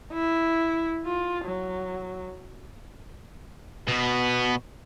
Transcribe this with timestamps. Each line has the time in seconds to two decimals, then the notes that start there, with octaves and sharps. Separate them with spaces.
0.13 E4
1.05 F4
1.45 F#3
3.88 B2 B3